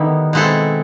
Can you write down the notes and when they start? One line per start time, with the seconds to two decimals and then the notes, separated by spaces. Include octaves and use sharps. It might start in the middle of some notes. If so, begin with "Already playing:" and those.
Already playing: D3 D#3 G3 B3 D#4 E4
0.33 B2 G#3 C4 E4 A4